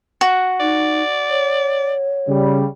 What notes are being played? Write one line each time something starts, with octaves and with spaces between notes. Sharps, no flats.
F#4
D#4 D5
C#5
C#3 G3